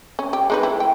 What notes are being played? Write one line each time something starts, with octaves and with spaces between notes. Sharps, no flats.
C#4
G4
G#3 D#4 B4
E4
G5